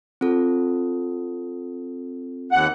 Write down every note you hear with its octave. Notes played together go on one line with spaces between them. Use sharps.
C4 F4 A4
D#2 F#5